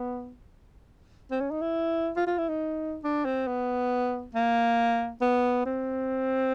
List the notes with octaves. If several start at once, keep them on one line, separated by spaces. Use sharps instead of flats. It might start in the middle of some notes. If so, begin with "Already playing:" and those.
Already playing: B3
C4
C#4
D#4
E4
F4
F4
E4
D#4
D4
C4
B3
A#3
B3
C4